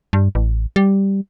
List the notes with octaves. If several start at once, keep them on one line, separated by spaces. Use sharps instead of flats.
G2
A1
G3